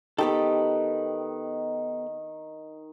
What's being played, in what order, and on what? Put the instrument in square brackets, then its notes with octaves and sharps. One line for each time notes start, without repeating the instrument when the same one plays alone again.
[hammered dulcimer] D#3 [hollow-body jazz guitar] B3 G4 A4